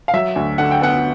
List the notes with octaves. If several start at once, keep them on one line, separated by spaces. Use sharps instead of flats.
F5
F#3 E5
D2
D3 F#5
G5
B3 F#5